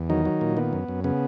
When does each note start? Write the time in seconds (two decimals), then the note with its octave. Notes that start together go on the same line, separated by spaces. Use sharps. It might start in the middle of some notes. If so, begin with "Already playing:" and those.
Already playing: E2
0.10 D#3 F#3 D#4
0.25 F#3
0.41 A#2
0.57 D#3 B3
0.73 F#2
0.88 F#2
1.04 C#3 B3